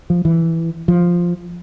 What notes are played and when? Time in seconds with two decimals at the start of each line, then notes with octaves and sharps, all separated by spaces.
0.10 F3
0.25 E3
0.88 F3